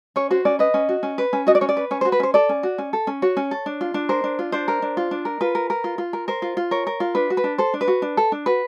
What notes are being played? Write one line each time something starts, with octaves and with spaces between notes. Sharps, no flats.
C#4 C#5
F#4 C5
C#4 D5
B4 D#5
C#4
F#4
C#4
B4
C#4
F#4 D#5
D5
C#4 C#5
D5
B4
C#4 C#5
C5
F#4
B4
C#4 C5
A4 D5
C#4
F#4
C#4
A4
C#4
F#4 C#5
C#4
A4
D4
F4
D4
A#4 C5
D4
F4
D4 C5
A#4
D4
F4
D4
A#4
F4 B4
A#4
A#4
F4
F4
A#4
A#4 C5
F4
F4
A#4 C#5
A#4
F4
D4 B4
F#4
B4
D4
A4 C5
D4
B4
F#4
D4
A4
D4
F#4 B4